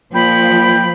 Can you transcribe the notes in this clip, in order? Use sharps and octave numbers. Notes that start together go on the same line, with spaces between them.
A#2 F3 G5 B5